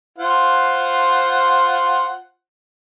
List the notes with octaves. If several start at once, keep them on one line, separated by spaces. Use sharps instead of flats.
F4 C5 F#5